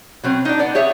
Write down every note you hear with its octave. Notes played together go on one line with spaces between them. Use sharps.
B2 F#3 C4
D4 D#4
B3 D5 F#5
G4 G#4 C#5 E5